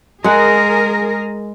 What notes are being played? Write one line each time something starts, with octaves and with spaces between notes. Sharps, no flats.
G#3 G#4 A#4 F#5